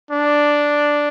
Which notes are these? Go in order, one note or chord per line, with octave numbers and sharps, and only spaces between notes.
D4